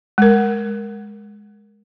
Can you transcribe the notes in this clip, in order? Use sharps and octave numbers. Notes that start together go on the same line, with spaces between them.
G#3 A#4